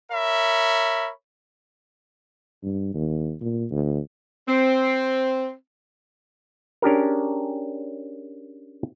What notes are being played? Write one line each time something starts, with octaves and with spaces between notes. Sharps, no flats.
A#4 C#5 E5 B5
G2
D#2
A#2
D2
C4
C#4 D4 G4 G#4 A#4